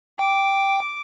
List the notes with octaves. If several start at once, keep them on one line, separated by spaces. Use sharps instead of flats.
G5 D6